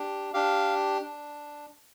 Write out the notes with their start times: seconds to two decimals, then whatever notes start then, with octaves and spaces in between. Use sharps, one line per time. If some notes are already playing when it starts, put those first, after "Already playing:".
Already playing: D4 G4
0.34 D4 G4 F5
1.02 D4